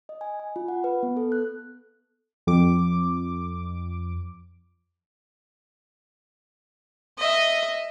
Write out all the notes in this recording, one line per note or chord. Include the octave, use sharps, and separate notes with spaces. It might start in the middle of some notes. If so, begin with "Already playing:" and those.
D#5
G#5
G#5
F4
F#5
B4
B3
A4
F#6
F2 D6
D#5 E5